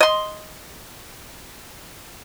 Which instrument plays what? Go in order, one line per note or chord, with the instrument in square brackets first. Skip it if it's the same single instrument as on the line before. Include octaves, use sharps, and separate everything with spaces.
[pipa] D#5 C6